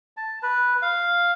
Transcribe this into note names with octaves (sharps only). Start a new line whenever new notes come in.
A5
B4
F5